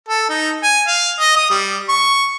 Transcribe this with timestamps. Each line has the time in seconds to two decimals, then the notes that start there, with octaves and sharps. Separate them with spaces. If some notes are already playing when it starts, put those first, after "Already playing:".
0.09 A4
0.29 D#4
0.64 G#5
0.88 F5
1.20 D#5
1.36 D#6
1.50 G3
1.89 C#6